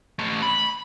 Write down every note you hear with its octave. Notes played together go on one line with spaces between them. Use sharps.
A3 C#4
B5